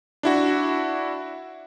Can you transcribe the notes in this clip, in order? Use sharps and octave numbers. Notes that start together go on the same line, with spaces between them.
D4 E4 F#4